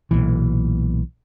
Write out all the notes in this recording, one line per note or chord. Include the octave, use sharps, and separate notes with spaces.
B1 A#2 E3